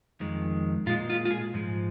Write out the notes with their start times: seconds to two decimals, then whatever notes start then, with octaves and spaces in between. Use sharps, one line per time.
0.20 F2 D#3 G#3
0.86 A#2 G#3 F4
1.10 F4
1.25 F4
1.31 G#4
1.54 G#2 F3 G#3